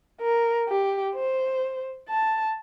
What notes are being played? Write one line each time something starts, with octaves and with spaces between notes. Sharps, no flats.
A#4
G4
C5
A5